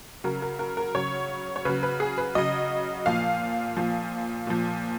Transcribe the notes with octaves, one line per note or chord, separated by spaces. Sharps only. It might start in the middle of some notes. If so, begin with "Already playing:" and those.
C#3 F#3 A#4
A#4
A#4
A#4
C#3 F#3 C#5
C#5
C#3 F#3 B4
B4
G#4
B4
C#3 F#3 D#5
A#2 F3 F5
A#2 F3
A#2 F3